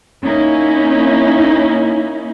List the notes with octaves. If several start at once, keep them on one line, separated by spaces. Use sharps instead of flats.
A#3 C#4 D#4 E4